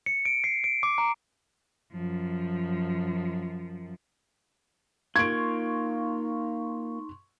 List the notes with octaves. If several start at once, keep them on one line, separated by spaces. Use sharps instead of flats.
C#7
D7
C7
D7
D6
A#5
F#2 F3
A#3 D#4 F4 C6 C#6 G#6 D7